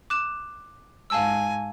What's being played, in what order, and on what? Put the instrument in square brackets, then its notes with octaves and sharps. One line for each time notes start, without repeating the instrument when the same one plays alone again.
[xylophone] D6 F#6 E7
[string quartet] G#2 G#5 [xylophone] F5 A5 E6